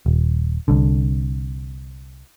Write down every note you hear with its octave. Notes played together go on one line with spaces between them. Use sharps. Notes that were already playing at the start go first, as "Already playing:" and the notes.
D#1
C2 D3